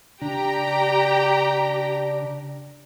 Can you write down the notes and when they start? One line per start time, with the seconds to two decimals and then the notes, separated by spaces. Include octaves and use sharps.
0.22 C#3 D4 G4 G5 A#5